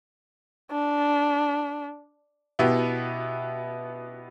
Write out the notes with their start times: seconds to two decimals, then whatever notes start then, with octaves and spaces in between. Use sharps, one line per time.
0.71 D4
2.59 B2 B3 E4 G4